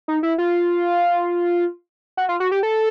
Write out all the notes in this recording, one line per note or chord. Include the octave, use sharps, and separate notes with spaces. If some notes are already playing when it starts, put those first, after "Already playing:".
D#4
E4
F4
F#4
F4
F#4
G4
A4